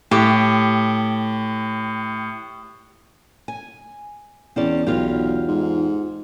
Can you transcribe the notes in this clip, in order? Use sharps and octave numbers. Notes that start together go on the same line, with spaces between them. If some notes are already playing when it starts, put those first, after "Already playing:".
A2 G4
G#5
E2 C4 C#4 D5
B1 E2 F4 G4
G#2